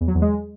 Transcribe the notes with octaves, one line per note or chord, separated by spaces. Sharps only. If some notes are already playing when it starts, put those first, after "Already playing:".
E2
F#3
E2
G#3